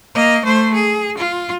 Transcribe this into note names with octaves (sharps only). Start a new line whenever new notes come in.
A#3 D#5
A3 C5
G#4
F4